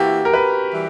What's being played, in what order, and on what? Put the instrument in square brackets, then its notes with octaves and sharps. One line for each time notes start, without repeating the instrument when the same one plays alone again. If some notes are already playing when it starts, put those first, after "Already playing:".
Already playing: [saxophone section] E3 A#3 E4 [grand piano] F#4 G4
[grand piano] A#4
B4
[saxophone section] E3 G3